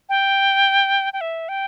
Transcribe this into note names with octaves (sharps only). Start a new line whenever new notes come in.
G5
G5
E5
G5